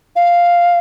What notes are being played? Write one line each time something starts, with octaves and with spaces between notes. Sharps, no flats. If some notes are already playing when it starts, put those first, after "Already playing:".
F5